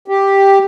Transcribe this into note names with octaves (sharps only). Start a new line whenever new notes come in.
G4